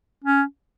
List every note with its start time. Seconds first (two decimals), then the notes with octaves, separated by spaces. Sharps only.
0.24 C#4